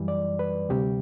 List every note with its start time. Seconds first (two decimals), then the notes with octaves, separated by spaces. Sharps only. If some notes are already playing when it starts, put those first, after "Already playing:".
Already playing: F#2 E3 G3
0.08 D5
0.39 B4
0.69 D2 C3 G3 G4